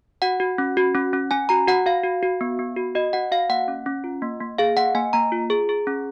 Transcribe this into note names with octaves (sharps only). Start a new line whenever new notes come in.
F#4 F#5
F#4
C#4
F#4
C#4
C#4
C#4 G#5
F#4 A#5
F#4 F#5
F#4 F5
F#4
F#4
B3
B3
F#4
F#4 D#5
F#4 F#5
F#4 F5
A#3 F#5
C#4
C#4
F4
A#3
A#3
G#4 F5
A#3 F#5
A#3 G#5
A#3 A#5
F4
G#4
G#4
C#4